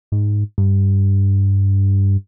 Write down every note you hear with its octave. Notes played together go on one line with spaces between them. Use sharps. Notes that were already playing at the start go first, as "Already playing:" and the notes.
G#2
G2